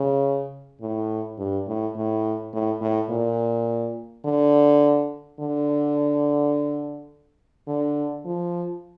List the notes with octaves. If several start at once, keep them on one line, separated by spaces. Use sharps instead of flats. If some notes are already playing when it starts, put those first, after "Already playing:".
Already playing: C#3
A2
G2
A2
A2
A2
A2
A#2
D3
D3
D3
F3